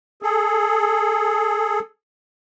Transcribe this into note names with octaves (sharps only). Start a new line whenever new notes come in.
G#4 A4